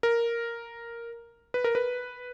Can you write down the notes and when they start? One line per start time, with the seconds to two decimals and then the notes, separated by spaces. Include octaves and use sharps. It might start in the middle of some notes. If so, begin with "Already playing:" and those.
0.03 A#4
1.54 B4
1.64 A#4
1.75 B4